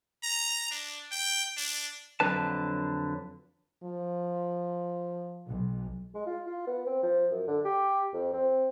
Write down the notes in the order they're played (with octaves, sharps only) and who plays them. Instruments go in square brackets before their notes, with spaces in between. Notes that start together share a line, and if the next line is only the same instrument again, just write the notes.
[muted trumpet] A#5
D4
G5
D4
[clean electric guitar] F2 D3 F#3 D4 B4 A5
[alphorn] F3
[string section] B1
[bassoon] G#3
F4
F4
B3
C4
F3
F#2
D3
G4
F2
C4